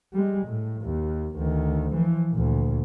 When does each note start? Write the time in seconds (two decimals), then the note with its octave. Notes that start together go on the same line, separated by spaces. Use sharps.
0.13 G3 G#3
0.47 A2
0.82 D#2
1.36 D2 D#3
1.93 E3 F3
2.31 D2 A#2